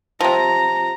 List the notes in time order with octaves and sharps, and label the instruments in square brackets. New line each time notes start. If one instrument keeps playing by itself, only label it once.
[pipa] C3 F3 [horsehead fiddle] A#5